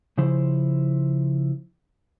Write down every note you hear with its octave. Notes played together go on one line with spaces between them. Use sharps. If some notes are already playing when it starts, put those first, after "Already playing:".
C#3 F3 E4 C5